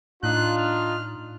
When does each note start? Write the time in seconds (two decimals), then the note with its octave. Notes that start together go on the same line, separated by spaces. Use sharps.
0.23 A2 D4 D#4 F4 F#6
0.58 F6